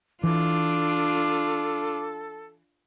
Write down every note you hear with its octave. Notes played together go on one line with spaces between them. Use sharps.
E3 D4 F4 A4 D6